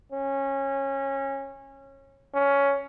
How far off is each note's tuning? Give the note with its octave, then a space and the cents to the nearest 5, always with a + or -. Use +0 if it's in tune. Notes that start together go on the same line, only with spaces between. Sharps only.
C#4 -20
C#4 +10